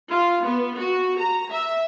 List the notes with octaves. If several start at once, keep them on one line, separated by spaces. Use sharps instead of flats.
F4
B3
F#4
A#5
E5